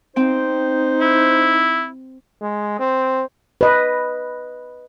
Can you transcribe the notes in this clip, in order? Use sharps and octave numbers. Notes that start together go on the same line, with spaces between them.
C4 D#4 C5 G5
E4
G#3
C4
B4 D#5